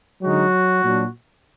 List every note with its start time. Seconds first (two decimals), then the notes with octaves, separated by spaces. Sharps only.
0.22 D3 F#3 G#3 D#4 F#4
0.84 A#2 F#3 D4